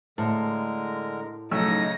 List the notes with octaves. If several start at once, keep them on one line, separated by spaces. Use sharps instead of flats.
A2 D3 G#3 A#4 A5
B1 C#3 A3 D#4 C#5 E6 A#6